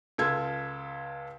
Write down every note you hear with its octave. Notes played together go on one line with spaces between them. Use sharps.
C#2 F4 A4 G#6